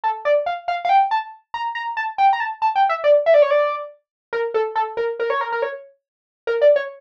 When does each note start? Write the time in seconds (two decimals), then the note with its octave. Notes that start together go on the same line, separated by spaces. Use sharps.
0.04 A4
0.25 D5
0.46 F5
0.68 F5
0.85 F5
0.89 G5
1.11 A5
1.54 A#5
1.75 A#5
1.97 A5
2.18 G5
2.33 A#5
2.40 A5
2.62 A5
2.76 G5
2.89 E5
3.04 D5
3.26 E5
3.34 D5
3.42 C#5
3.51 D5
4.33 A#4
4.54 A4
4.75 A4
4.97 A#4
5.20 A#4
5.30 C#5
5.41 A#4
5.52 A#4
5.62 C#5
6.47 A#4
6.62 D5
6.76 C#5